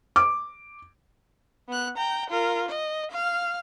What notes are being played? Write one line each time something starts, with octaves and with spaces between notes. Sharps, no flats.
D6
B3 F#6
G5 A#5
F4 A#4
D#5
F5 F6